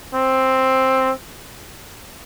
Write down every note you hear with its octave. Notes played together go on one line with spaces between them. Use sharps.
C4